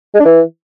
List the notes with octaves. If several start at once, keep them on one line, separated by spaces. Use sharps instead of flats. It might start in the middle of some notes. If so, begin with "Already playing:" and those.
G#3
D4
E3